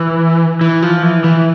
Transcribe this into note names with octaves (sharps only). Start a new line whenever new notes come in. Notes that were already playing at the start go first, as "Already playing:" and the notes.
Already playing: E3
E3
F3
E3
E3